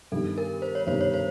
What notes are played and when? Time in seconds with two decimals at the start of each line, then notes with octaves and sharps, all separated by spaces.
0.12 G2 D#3 G3 B3 D4 A4
0.38 A#4
0.62 C5
0.75 C#5
0.87 G2 D#3 G3 B3 D4 C5
1.01 C#5
1.14 C5